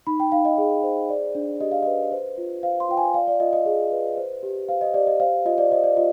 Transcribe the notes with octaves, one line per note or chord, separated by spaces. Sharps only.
D#4 B5
G5
D#4 F5
D#5
G#4
C5
D5
D4
G4 D#5
F5
B4 D#5
C5
F4
C5 F5
C6
F4 G5
G#5
D5 F5
D5
F4 D#5
D#5
G#4
B4
C5
G4
C5 F5
D#5
G4 D5
D#5
C5 F5
F4 D#5
D5
C5 D#5
D5
F4 D#5